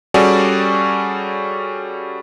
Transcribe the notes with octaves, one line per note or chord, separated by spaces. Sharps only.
G3 C#4 F#4 G#4 A4 D5